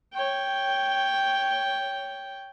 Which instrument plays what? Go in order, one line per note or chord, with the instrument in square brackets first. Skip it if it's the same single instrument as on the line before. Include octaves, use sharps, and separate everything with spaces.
[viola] C#5 G5